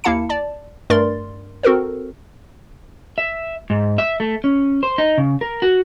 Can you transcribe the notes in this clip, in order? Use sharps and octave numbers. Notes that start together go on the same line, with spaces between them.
D#2 A#3 E4 F5 A5 C#7
D5 A5
G2 A3 A#4 D5 C6 A6
C4 F#4 A4 A#4 C5
E5
G#2
E5
A3
C#4
C5
D#4
C#3
A#4
F#4